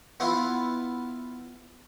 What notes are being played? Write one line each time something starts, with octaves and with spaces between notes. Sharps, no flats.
B3 E4 F4